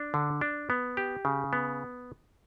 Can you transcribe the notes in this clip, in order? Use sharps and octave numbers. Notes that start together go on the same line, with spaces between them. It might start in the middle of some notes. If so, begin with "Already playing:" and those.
Already playing: D4
D3
D4
B3
G4
C#3
B3